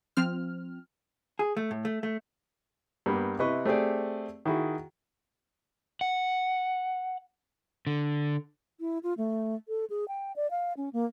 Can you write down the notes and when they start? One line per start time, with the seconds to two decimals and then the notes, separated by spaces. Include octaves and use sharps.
0.17 F3 C4 F6
1.39 G#4
1.57 A3
1.71 A2
1.85 A3
2.03 A3
3.06 G2 A#3 B3 G4
3.39 C3 E4 B4 D#5 C#6
3.65 A3 C4 G4 G#4 D5
4.46 D#3 E4 F#4 G#4
6.01 F#5
7.87 D3
8.80 E4
9.03 F4
9.18 A3
9.68 A4
9.90 G#4
10.08 G5
10.36 D5
10.51 F5
10.77 C#4
10.93 A#3